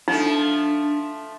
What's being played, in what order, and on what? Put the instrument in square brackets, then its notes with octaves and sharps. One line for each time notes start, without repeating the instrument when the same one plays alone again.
[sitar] F3 A3 [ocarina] D4 [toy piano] D#4